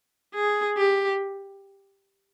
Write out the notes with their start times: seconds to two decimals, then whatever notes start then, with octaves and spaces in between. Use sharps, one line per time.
0.35 G#4
0.78 G4